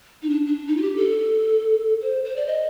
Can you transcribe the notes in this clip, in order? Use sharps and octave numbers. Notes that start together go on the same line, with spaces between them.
D#4
D4
D4
D#4
F4
G4
A4
C5
C5
D5
D#5